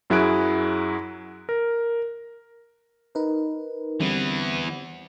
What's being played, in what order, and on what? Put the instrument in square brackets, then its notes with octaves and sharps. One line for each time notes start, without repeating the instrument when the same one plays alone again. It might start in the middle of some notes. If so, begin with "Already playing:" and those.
[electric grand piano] F#2 F#3 E4 G#4 F#6 D7
A#4
[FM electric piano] D#4 A#4 B4
[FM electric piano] D3 G3 C4 [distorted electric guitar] E3 B3